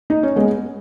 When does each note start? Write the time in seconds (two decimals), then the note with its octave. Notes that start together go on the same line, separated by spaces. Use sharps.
0.10 D#4
0.23 C#4
0.36 G#3 B3